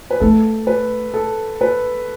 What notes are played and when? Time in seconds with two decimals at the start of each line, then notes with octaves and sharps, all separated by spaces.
0.10 B4
0.20 A3 A4
0.67 B4
1.14 A4
1.61 B4